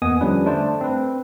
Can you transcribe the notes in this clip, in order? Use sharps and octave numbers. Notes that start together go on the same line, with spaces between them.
E2 A#3 B3 D#5 G#5 D#6
D3 F3 G3 C#4 D4 B4
A3 D4 C5 A5
C4 B4